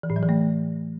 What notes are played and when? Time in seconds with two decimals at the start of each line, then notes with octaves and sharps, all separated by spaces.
0.03 E3
0.10 A2
0.16 F#3
0.22 E3
0.29 A3